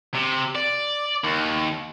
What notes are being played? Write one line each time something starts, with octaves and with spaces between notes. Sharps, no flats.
C3
D5
D#2